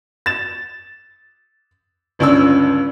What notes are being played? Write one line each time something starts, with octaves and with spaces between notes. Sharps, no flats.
A6 E7
G1 C#2 C#4 D4 E6